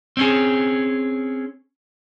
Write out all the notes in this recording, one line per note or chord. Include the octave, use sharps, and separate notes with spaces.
C4 C#4 G#4